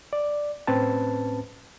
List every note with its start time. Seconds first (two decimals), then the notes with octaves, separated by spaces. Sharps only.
0.13 D5
0.67 A2 C4 C#4 B4 A5